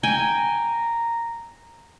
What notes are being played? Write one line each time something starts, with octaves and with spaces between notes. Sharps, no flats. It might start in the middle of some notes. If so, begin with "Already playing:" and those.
G5 G#5 A#5